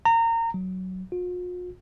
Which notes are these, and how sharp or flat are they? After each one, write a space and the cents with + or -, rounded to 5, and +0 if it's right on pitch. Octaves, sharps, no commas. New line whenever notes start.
A#5 -25
F#3 +10
F4 +45